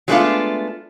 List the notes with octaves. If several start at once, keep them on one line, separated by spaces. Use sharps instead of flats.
F#3 G#3 A3 B3 D4 F4